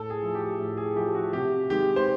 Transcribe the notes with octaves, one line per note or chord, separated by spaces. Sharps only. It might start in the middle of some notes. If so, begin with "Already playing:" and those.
Already playing: A2 A4
G#4
F3 A3
G4
A2
G#4
F3 A3 G4
F#4
C3 G4
D#3 G#3 G4
C5